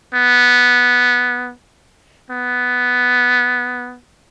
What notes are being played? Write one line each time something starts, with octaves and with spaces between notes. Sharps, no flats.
B3
B3